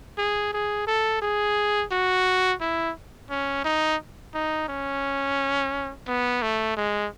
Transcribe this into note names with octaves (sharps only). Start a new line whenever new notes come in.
G#4
G#4
A4
G#4
F#4
E4
C#4
D#4
D#4
C#4
B3
A3
G#3